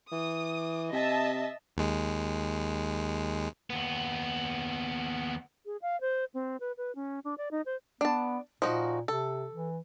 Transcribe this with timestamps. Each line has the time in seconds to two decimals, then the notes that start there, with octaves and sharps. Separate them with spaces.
0.12 E3 D#6
0.92 C3 D#5 E5 A5
1.77 D#2 G#3
3.70 D#2 B3
5.66 G#4
5.82 F5
6.01 C5
6.34 C4
6.60 B4
6.78 B4
6.95 C#4
7.24 D4
7.38 D5
7.51 D#4
7.66 C5
8.01 B3 D4 A5
8.62 A#2 F3 D#4 F#4
9.08 C3 A4
9.51 E3